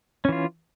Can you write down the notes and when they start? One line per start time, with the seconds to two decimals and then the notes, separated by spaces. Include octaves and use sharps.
0.25 C#4
0.29 E3
0.32 F4